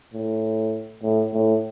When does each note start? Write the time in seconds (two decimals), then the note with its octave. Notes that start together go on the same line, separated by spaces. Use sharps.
0.13 A2
1.03 A2
1.33 A2